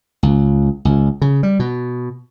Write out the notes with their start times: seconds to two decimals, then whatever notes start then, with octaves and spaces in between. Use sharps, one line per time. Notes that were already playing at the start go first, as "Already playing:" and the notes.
0.23 C#2
0.85 C#2
1.22 C#3
1.43 G3
1.59 B2